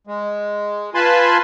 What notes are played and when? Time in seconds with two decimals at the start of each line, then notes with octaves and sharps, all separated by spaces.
0.07 G#3
0.95 F4 B4 G#5 A5 B5 C6